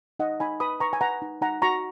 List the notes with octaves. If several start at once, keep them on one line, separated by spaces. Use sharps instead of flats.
D#4 D#5 F#5
D#4 G#5 B5
B4 B5 D#6
B4 A#5 C#6
G#5
B4 F#5 A#5
D#4
D#4 F#5 A#5
F#4 A#5 C#6